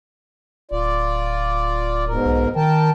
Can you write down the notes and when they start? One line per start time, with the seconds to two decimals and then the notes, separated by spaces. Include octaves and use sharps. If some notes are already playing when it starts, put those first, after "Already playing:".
0.71 D1 F4 D5
2.08 G#2 B2 A#4
2.25 B1
2.56 D#3 A#4 G5 A5